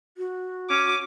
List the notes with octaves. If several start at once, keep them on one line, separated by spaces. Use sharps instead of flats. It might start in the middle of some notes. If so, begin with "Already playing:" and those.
F#4
C#4 D6